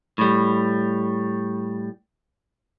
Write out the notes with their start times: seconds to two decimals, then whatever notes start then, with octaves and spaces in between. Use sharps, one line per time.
0.18 A2 G3